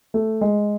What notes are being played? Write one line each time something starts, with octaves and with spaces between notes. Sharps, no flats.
A3
G#3